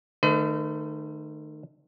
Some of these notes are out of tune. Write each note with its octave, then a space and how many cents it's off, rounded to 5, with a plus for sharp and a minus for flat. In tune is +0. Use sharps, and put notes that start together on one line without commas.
D#3 -30 A3 +0 B4 +45